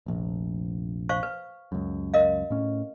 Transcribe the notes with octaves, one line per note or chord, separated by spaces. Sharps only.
F1 A#1
C5 F5 C#6
B4
C#2 F#2
A#4 D#5 F5
A2 C#4